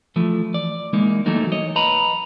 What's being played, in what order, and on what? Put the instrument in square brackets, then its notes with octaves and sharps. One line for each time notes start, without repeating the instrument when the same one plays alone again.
[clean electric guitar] E3 F3 A3
D5
E3 G#3 A#3 D#4
E3 F#3 A3 A#3 D#4
C#5 D#5
B4 D#5 A#5 B5